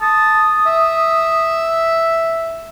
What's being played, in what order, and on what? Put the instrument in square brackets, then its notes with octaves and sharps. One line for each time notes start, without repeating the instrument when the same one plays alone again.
[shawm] A5 [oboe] D#6
[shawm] E5